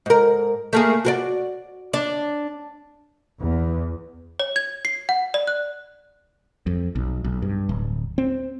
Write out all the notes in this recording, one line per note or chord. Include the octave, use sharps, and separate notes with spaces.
G#2 A#4
A3 A#3 G#4
F#4 A#4 D5
D4
E2
C#5
G#6
C7
F#5
D5
F#6
F2
B1
B1
G2
D1
C4